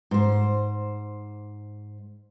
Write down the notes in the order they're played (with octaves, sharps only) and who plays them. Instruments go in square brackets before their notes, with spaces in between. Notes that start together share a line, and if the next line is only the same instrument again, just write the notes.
[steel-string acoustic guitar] G#2 C5